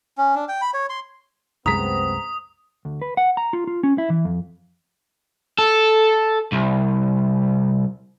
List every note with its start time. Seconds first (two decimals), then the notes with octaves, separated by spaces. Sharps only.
0.18 C#4
0.35 D4
0.48 G5
0.62 B5
0.74 C#5
0.89 C6
1.66 C2 F#2 G#3 B3 C4 A#5 D#6 B6
2.85 D2
3.02 B4
3.17 F#5
3.37 A#5
3.53 F4
3.67 F4
3.83 C#4
3.98 E4
4.10 E3
4.25 F2
5.59 A4
6.52 C2